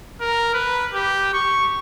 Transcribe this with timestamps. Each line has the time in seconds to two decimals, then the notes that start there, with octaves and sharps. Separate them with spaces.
0.21 A#4
0.54 B4
0.93 G4
1.33 C#6